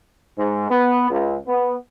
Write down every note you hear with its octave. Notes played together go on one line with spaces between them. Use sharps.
G#2
B3
C#2
B3